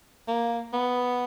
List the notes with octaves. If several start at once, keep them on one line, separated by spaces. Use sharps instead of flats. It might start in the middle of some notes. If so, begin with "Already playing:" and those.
A#3
B3